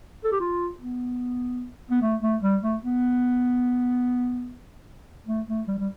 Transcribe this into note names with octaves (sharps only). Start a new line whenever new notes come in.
A4
G4
F4
B3
B3
A3
A3
G3
A3
B3
A3
A3
G3
G3